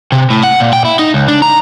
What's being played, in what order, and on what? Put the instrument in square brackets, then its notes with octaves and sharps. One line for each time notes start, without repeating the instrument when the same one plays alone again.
[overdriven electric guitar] C3
A2
F#5
A#2
G5
E4
D#4
C#2
D4
A#5